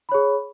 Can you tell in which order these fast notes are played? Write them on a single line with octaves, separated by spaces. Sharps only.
B5 C#5 G#4